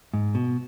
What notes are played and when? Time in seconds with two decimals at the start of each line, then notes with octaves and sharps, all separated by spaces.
0.14 G#2
0.35 B2